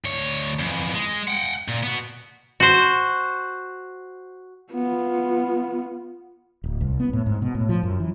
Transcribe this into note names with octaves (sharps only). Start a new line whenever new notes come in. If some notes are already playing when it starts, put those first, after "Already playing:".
D2 C#5
F2 E3
G#3
F#5 G5
A#2
B3 F#4
F#4 C5
B3 F4
D1
C2
B3
A2
G#2
B2
A2
F3
F#2
E3